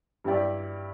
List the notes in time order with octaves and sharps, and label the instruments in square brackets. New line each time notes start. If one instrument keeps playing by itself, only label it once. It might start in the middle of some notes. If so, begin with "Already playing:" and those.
[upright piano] G2 G3 E4 G4 D5